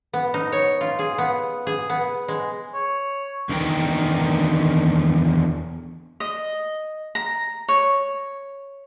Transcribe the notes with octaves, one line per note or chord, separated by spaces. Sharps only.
B3
D#4
C#5
F4
G#4
B3
G#4
B3
G#3
C#5
E2 D3 D#3 E4 A#4 G5
D#5
A#5
C#5